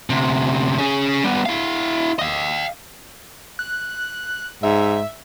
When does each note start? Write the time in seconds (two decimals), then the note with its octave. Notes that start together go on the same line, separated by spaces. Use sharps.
0.10 D2 C3
0.78 C#4 G#4
1.24 G3 B3
1.46 E4 F5
2.19 D#5 F5
3.59 F#6
4.63 G#2 E5